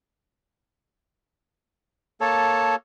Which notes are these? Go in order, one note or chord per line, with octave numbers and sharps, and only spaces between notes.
A#3 A4 C#5 A5